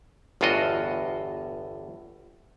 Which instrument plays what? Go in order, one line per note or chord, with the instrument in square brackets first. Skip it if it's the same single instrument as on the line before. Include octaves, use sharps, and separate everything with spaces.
[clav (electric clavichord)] G1 E2 A2 F4 F#4 D#5